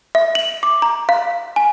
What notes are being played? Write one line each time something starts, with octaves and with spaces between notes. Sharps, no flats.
E5
F#7
D6
A#5
F5
G#5